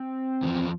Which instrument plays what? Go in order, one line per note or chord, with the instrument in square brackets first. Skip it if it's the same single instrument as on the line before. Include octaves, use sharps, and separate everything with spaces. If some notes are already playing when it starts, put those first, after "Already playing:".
Already playing: [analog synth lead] C4
[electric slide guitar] E2 D3
F3